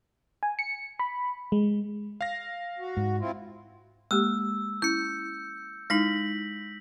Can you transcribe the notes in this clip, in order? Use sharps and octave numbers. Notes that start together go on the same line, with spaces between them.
G#5
C#7
B5
G#3
F5 A#6
F#4
G#2
C4 E4 F4
G#3 A#3 G4 E6
C#4 E4 G6 C#7
G#3 D#4 E4 A#6 B6 F#7